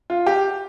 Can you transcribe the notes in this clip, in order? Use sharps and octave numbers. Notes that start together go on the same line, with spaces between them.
F4
G4